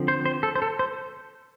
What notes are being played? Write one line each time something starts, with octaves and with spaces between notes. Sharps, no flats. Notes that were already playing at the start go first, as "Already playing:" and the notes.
Already playing: D3 F3 C4
C5
C5
A4
C5
A4
C5